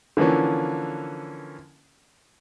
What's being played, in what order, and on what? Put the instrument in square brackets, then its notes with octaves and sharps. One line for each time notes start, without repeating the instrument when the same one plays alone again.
[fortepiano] D3 E3 F3 A#3 C#4